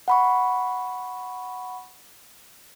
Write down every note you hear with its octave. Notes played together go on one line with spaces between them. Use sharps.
F#5 B5 C#6